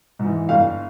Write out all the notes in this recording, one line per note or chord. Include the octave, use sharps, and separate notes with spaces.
G#2 E3
G1 F5